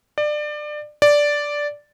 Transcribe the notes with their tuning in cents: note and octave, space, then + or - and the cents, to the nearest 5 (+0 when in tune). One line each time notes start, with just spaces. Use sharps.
D5 +25
D5 -5